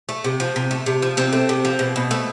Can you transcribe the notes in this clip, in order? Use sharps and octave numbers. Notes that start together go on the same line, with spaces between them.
A3
C3
F3
C3
A3
C3
F3
C3 C4
A3
C3
F3
B2
B2
A3